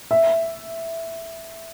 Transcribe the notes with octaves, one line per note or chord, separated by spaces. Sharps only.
E5